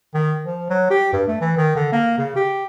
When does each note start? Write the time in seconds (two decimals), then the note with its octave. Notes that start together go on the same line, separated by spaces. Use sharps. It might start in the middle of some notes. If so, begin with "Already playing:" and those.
0.15 D#3
0.45 F3
0.70 F#3
0.91 G4
1.13 G2
1.27 A3
1.41 E3
1.57 D#3
1.76 D3
1.92 A#3
2.18 C#3
2.36 G4